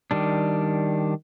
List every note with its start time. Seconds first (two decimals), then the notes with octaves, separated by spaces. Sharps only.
0.11 D#3 G3 D4